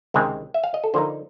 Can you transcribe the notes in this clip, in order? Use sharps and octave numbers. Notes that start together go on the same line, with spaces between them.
C#2 C3 D#3 G#3 C4
E5
F5
D#5
A4
D3 F3 A#3 D#4 C5